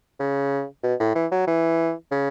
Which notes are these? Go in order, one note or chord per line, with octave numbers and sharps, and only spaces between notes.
C#3
B2
A2
E3
F#3
E3
C#3